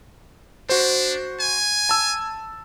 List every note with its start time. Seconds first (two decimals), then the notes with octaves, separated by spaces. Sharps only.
0.69 D4 F#4 C5
1.40 G#5
1.89 A5 E6